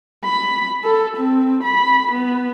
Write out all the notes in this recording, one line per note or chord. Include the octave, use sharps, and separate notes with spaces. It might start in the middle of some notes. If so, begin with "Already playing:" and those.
B5
A4
C4
B5
B3